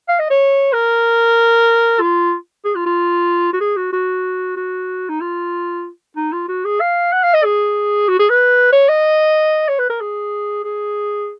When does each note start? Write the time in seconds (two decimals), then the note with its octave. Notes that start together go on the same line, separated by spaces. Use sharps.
0.09 F5
0.20 D#5
0.30 C#5
0.73 A#4
2.00 F4
2.65 G#4
2.75 F4
2.86 F4
3.53 F#4
3.60 G#4
3.77 F#4
3.93 F#4
4.56 F#4
5.09 D#4
5.21 F4
6.16 D#4
6.32 F4
6.48 F#4
6.65 G#4
6.80 F5
7.13 F#5
7.23 F5
7.34 D#5
7.44 G#4
8.08 F#4
8.19 G#4
8.30 B4
8.72 C#5
8.89 D#5
9.68 C#5
9.79 B4
9.90 A#4
10.00 G#4
10.64 G#4